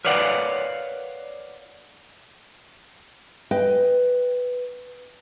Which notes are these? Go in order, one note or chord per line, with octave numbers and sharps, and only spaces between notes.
A#4 B4 C#5 D5 F5 F#5
B4 D#5 G5